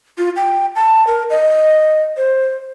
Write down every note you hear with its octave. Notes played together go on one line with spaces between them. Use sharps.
F4
G5
A5
A#4
D#5
C5